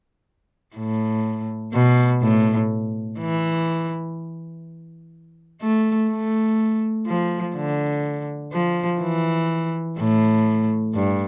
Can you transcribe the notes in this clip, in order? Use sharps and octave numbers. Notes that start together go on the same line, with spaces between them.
A2
B2
A2
E3
A3
A3
F3
D3
F3
E3
A2
G2